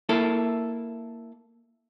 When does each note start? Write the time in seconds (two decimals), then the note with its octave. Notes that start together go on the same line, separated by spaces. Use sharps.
0.09 A#3 E4 A4